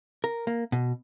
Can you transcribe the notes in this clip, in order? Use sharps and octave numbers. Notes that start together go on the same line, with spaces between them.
A#4
A#3
B2